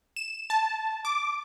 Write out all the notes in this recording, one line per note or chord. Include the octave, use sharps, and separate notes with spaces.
E7
A5
D6